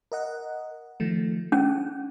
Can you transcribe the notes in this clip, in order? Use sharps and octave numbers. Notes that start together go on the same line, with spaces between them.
A#4 D#5 F#5
D#3 F3 A3
C#4 F#5